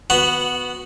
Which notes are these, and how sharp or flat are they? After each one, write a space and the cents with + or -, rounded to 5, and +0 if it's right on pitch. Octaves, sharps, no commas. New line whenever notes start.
B3 +0 F#4 -10